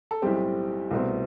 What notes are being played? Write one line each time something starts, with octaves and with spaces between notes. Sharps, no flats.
A4
B1 A2 G3 C4 G4
C2 B2 A3 C4